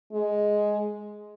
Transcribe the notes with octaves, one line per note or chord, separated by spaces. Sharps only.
G#3